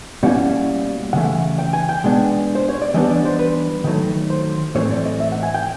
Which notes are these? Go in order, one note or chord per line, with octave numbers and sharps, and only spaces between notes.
B2 G3 A#3 C#4 E4 F#5
C#3 E3 A3 F#5
G5
G#5
G5
B2 G#3 B3 D4
C5
C#5
D5
E3 G3 B3 D4 D#5
D5
C5
B4
D#3 F#3 A3
C5
A2 E3 A3 C4 C#5
D5
D#5
E5
F#5
G#5
G5